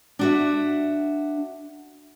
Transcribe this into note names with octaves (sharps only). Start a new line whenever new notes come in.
D4 F#4 E5